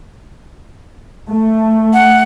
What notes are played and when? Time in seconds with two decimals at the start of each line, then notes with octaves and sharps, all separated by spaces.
1.29 A3
1.94 F#5